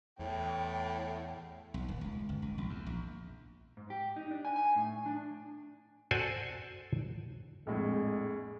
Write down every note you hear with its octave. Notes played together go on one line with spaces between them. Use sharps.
E2 A2 G5
B1
D#1
C#2
G1
C#2
A#1
E2
A#1
G#2
G4
D#4
D4
G#5
G#5
A2
D4
F#4 A4 C5 D5 G#5
A#1 F2 A2 G#3